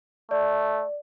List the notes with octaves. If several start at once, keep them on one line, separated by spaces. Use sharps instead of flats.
A3 D5